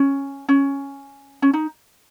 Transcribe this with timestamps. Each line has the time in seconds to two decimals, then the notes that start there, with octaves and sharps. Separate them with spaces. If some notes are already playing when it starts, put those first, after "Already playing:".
Already playing: C#4
0.49 C#4
1.42 C#4
1.53 D#4